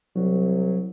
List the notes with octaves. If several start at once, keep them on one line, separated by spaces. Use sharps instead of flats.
C2 F#3